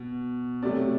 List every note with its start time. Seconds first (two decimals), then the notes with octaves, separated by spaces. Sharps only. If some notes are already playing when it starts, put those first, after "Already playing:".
Already playing: B2
0.63 C3 F#3 A3 D5